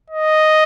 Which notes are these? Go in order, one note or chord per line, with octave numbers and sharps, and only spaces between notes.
D#5